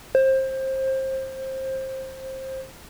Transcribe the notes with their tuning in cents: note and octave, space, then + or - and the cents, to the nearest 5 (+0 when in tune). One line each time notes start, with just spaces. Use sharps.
C5 +20